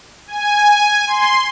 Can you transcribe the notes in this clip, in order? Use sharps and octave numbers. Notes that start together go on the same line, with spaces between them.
G#5
C6